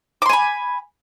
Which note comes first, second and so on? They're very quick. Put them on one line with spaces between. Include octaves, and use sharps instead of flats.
D6 C6 G#5 B5